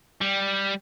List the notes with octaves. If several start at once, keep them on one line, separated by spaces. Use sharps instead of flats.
G3